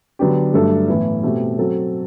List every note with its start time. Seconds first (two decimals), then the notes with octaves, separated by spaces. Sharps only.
0.19 D3 F#3 B3 D4 G4
0.53 G2 F#3 A3 D4 A4
0.88 A2 E3 B3 E4
1.23 B2 A3 C4 G4
1.59 F#3 C4 F#4 A4